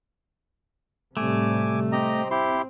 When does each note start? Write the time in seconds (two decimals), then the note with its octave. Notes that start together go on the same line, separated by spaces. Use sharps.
1.17 A2 C3 G3 A3 G#5 D6
1.92 C4 G4 D#5 A#5
2.31 E4 G4 C6